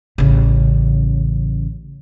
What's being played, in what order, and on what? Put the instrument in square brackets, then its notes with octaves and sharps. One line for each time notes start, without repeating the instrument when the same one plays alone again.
[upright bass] A1 C#3